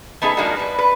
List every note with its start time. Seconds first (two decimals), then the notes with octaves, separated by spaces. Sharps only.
0.22 A3 B3 D#4 G#4 A#4 E5
0.37 F3 G#3 A#3 D4 D#4 F#4
0.56 G3 B4
0.79 B4